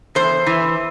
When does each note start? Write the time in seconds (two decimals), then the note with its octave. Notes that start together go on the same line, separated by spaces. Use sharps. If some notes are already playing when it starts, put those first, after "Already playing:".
0.15 E2 C5
0.46 E3